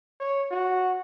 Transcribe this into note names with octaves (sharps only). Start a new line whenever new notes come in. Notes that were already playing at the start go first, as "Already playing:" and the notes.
C#5
F#4